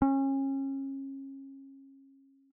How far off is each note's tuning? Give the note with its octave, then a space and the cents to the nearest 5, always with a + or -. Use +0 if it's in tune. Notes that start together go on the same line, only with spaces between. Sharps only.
C#4 -30